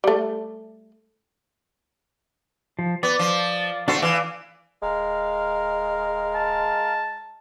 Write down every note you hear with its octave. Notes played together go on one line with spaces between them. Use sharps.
G3 A3
F3
B3 D5
F3
A3 D4 F#4 C5
E3 D5 F5
D1 G#3 A#4 F5
A5